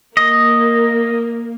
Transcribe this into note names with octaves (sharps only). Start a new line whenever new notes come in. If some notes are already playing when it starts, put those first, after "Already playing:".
A#3 D#5